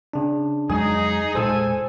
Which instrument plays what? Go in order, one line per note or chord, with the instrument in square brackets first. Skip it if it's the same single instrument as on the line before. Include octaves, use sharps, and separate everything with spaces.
[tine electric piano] C#3 D4
[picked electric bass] F2 F#3 G#3 [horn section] D#4 G#4 [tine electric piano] G#5 D#6
[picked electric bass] E1 A#2 G#3 [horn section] A4 G#5 [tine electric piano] C5 E6